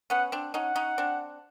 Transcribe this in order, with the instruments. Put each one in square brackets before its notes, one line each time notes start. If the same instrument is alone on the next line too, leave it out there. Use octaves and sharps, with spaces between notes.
[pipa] B3 C#4 [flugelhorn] F#5
[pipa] C4 D4
[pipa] C#4 D#4 [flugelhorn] F#5
[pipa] C#4 D#4
C4 D4